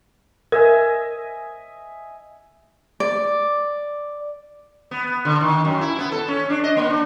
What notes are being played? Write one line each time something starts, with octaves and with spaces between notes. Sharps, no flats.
A#4 D#5 E5 G#5
D5
B3
D3
D#3
F#2
E4
B3
A4
C#4
D4
D#5
A#3
D4